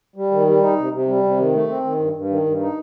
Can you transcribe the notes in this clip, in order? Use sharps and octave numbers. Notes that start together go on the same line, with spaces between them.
G3
D#3
G3
D#4
C3
C3
G3
C3
D#3
A3
C4
D#3
G2
G2
D#3
G2
D#4